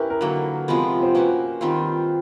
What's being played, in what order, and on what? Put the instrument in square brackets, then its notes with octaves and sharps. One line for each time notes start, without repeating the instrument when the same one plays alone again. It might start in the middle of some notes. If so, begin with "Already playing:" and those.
Already playing: [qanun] C#4 E4 G4 [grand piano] A#4 B4
[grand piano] A#4
[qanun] D3 F#3 A#3
C3 F3 G#3 B3
[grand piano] C5
[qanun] A#3 C#4 F#4 [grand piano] B4
[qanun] D#3 G3 C4 F4